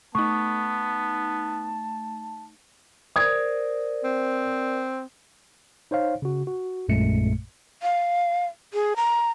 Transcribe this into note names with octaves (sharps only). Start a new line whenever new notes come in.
A3 B3 D#4 A5 C#6
A#4 C5 D5 D#6 G#6
C4
D#4 C5 C#5 F5
C#3 F#4
F#4
A#1 F#2 A#2 G#3 A3 C#7
F5
G#4
A#5